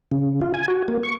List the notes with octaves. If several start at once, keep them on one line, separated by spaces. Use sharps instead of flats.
C#3
F4
G#5
F#4
A#3
C#6